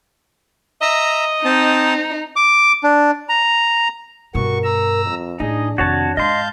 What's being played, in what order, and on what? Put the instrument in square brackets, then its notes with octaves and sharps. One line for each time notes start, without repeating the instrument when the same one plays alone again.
[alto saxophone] D#5 [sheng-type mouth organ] E5 A#5
[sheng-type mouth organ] C4 A5 [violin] D#4
[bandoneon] D6
D4
A#5
[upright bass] G2 B2 [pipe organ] F#4 C#6 [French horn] A#4
[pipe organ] A#5 E6
[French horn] F2
[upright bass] A2 [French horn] D4 [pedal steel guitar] D#4 [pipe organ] G#4 D#5
[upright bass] F2 D#3 [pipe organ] C3 [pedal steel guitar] F#4 C#5 A5
[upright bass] G#2 [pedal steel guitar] D#5 C6 [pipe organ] F5 A5 G6